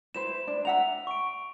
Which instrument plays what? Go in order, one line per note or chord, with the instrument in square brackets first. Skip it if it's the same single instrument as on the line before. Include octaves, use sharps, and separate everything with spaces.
[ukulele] E4 B4 C5 [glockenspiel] E7
[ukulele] D4
[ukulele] E5 F#5 A#5 [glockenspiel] F7
[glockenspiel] C#6 D7